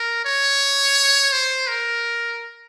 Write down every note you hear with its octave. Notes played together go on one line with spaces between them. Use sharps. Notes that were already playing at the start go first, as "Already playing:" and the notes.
Already playing: A#4
C#5
C5
A#4